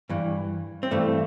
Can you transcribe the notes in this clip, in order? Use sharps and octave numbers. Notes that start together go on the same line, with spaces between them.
G2 E3
C4
G2 E3 A3